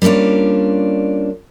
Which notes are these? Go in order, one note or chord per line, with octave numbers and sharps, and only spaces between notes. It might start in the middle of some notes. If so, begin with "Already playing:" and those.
G3 A#3 C#4 D4 F4